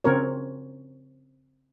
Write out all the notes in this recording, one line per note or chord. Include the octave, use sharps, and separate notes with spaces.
C#3 C4 A#4 C#5